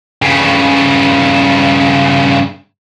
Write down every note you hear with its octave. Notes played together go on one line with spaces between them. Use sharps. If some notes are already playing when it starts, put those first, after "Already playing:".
G2 C#3